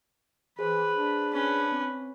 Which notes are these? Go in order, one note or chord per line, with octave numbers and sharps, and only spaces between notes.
E3 G#4 B4 C5
D4
C#4 B4
C4